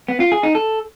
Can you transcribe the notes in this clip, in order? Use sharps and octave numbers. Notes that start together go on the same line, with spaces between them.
B3
F4
G#4
D#4
A4